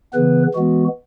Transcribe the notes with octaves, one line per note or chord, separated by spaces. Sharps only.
C#3 E3 B3 B4
E3 G#3 B3 F#4